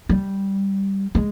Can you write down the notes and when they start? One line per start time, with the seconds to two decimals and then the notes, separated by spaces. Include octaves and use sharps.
0.09 G3
1.15 G#3